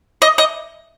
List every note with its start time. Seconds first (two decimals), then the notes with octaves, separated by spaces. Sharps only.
0.22 D#5
0.38 D#5